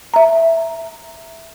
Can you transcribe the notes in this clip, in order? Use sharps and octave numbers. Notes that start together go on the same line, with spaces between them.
E5 A#5